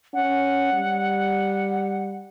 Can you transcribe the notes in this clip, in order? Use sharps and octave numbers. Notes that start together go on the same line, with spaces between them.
C#4 F#5
G3